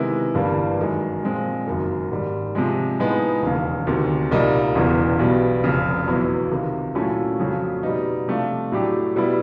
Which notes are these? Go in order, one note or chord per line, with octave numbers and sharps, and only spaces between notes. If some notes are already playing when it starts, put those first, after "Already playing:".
Already playing: C3 D#3 G#3 B3 E4
G1 G2 E3 G3 A#3
F#2 D#3 G#3
A#2 F3 G#3 C4
F#1 F#2 D#3
G#2 D#3 G3
C3 F3 G#3
A2 F3 G#3 B3 D#4
E1 D#2 C#3
D2 C3 D#3
C2 A#2 G3 A#3 D#4
E1 E2 C#3 E3
B1 B2 G3 B3
F1 F2 C#3
E2 B2 F#3 B3 E4
C#2 C3 D#3
A#2 F#3 A3 C#4 E4
F2 C#3 F#3 A3 C#4
B2 G3 B3 D#4
C3 F3 A3 D4 F4
A2 F#3 A3 D4 G4
B2 G3 B3 E4